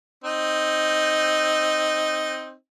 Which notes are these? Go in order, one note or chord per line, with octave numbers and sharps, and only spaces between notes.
C4 D#4